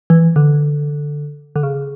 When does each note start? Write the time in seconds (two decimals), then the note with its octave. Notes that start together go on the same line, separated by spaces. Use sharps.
0.10 E3
0.36 D3
1.56 D3
1.63 C#3